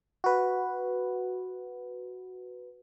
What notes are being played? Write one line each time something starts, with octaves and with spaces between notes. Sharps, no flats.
F#4 B4